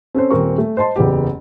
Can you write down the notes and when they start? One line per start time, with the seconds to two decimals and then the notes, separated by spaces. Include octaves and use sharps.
0.14 C4 C#4 A4 C5
0.30 D#1 C4 A#4 C#6
0.58 A3
0.77 C5 D#5 A5 C6
0.96 F#1 E2 B3 G4